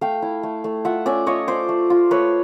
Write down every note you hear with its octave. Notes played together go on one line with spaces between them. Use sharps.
A3 F5 G5
E4
A3
A3
F4 E5 F#5
C#4 D5 E5
F4 C#5 D#5
F4 C5 D5
A3
F4
A3 B4 C#5